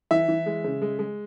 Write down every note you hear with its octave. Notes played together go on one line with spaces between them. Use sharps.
E3 E5
E3
G#3
C#3
G#3
G#3